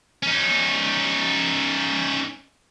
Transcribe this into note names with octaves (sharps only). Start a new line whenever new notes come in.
C#4 D#4